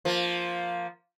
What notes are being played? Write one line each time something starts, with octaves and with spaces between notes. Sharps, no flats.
F3 A#3